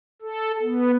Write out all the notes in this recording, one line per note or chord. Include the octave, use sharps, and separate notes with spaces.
A4
B3